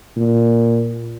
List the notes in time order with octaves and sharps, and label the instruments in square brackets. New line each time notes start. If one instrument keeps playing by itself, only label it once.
[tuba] A#2